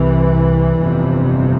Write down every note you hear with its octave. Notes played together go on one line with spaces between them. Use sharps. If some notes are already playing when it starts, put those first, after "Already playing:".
Already playing: C2 C3 E3
G1 F2 C3